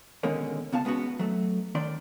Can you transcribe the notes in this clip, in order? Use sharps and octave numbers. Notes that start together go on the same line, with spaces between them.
B2 D3 D#3 G#3 A#3 C#4
C#2 B3 F5 A5
G#3 B3 C#4 D4 F#4
F#3 A3
D#2 D#3 D4 D5 C6